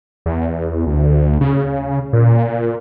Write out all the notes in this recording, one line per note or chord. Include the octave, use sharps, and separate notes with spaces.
E2
D2
C#3
A#2